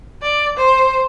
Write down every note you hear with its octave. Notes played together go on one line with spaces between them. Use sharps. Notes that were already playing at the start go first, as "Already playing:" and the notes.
D5
C5